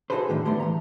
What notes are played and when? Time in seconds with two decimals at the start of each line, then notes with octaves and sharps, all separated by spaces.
0.10 D#4 F#4 G#4 A4 B4 C5
0.28 A2 D3 D#3
0.45 A2 G3 A3 B3 C6
0.60 E3 A#5